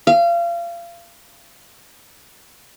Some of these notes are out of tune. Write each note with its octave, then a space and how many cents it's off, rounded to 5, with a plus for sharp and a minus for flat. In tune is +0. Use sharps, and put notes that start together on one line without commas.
F5 -30